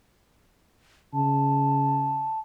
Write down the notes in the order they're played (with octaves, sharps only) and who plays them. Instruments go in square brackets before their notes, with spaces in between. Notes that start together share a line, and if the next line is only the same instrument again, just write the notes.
[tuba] C#3 [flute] A5